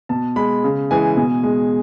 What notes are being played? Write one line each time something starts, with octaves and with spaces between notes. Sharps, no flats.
B2 A5
G#3 B5
C#3
E3 G#3 G#5
B2
G#3